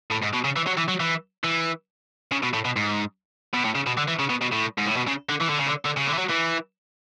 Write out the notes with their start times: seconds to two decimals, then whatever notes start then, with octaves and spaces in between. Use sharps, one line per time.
0.12 A2
0.23 G#2
0.34 B2
0.45 C#3
0.56 E3
0.67 F#3
0.77 E3
0.88 F#3
1.00 E3
1.44 E3
2.32 C#3
2.43 B2
2.54 A2
2.65 B2
2.76 G#2
3.54 B2
3.65 A2
3.75 C#3
3.87 B2
3.97 D3
4.08 E3
4.19 C#3
4.30 B2
4.42 B2
4.52 A2
4.78 G#2
4.87 A2
4.97 B2
5.07 C#3
5.29 D3
5.41 E3
5.49 D3
5.58 C#3
5.66 D3
5.85 D3
5.97 C#3
6.07 D3
6.13 E3
6.18 F#3
6.29 E3